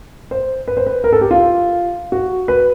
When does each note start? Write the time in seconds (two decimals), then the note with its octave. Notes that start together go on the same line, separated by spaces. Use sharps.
0.31 C5
0.68 B4
0.77 C5
0.87 B4
1.04 A#4
1.13 A4
1.21 G4
1.31 F4
2.12 F#4
2.48 B4